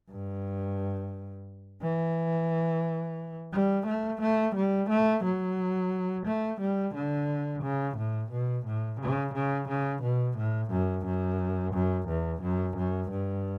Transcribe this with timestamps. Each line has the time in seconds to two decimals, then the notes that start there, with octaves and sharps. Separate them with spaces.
0.10 G2
1.82 E3
3.53 G3
3.87 A3
4.21 A3
4.56 G3
4.90 A3
5.24 F#3
6.26 A3
6.61 G3
6.94 D3
7.63 C#3
7.97 A2
8.31 B2
8.65 A2
9.00 C#3
9.34 C#3
9.69 C#3
10.02 B2
10.38 A2
10.71 F#2
11.06 F#2
11.74 F#2
12.08 E2
12.42 F#2
12.77 F#2
13.11 G2